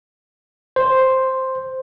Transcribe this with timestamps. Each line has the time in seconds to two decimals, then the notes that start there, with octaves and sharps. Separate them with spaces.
0.76 C5